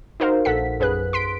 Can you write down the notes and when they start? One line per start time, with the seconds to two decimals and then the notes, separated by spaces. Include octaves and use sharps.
0.20 D#4 F#4 A#4 C5 F5
0.45 A#1 A4 F#5 B6
0.80 F#2 G#4 B4 F#6
1.13 C6 B6 D7